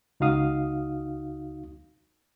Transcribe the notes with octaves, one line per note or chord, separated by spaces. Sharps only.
C#2 D#4 F#4 F5 D#6